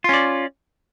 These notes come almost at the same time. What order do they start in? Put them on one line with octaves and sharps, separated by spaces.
F4 C#4 D5